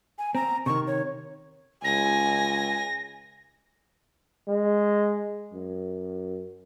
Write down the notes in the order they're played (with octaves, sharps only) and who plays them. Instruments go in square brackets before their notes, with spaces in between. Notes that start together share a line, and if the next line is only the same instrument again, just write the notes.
[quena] G#5
[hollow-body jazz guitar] C4 [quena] A#5
[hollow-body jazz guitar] C3 D#3 [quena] C#6
[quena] C#5
[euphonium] C#2 [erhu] G#5 [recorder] A#6
[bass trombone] G#3
F#2